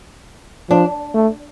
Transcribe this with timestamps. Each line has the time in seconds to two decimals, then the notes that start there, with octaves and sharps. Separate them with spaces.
0.70 F3 D4
1.14 A3